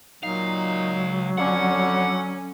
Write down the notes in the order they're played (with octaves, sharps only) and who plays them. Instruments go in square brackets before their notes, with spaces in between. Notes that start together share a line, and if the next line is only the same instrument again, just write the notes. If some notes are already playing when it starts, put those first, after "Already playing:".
[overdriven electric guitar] C#2 F5 [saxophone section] A#2 D#4 [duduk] F#3
[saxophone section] F2 D3 [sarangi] C#4 [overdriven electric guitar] F#5